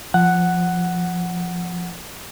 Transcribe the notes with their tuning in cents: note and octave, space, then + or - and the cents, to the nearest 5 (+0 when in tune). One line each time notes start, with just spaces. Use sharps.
F3 +0 F#5 +0